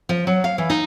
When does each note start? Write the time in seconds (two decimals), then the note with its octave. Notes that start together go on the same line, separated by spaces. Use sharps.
0.09 F3
0.27 F#3
0.44 F5
0.58 E3
0.70 D#4